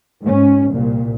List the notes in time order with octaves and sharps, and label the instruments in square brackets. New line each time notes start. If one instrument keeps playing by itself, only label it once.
[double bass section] G#2 C#4
C2 A#2